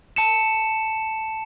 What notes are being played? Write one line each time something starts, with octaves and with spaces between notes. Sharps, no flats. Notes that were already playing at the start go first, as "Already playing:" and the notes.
A5 C#7 E7